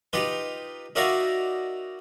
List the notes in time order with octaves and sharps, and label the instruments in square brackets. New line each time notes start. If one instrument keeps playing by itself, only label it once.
[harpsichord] D#4 F4 G4 B4
D#4 F#4 A#4 D5 E5 F5